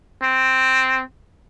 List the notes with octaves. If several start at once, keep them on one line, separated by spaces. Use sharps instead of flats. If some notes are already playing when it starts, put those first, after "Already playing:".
C4